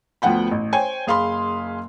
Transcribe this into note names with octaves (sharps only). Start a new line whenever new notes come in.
D2 F3 B3 F#5 G5 B5
A1
C5 C#5 G5 G#5
F#1 G#4 F5 B5 C6